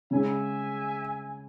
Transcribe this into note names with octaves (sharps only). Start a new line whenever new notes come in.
C#3 G#3 C#4 E5 G#5